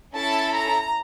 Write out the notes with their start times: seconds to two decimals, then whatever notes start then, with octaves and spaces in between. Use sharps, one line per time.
0.16 C#4 E4 A4 A5
0.54 A#5